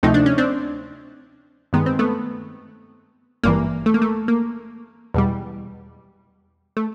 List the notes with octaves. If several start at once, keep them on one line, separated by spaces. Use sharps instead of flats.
D2 C3 F3 A3 D#4
D4
C#4
C4 D4
G2 D#3 G#3 B3
C4
A3 B3
G#1 G2 E3 A#3
A3
A#3
A3
A#3
E2 B2 G3
A3